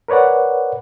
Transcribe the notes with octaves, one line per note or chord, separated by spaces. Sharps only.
A#4 B4 C#5 D5 F#5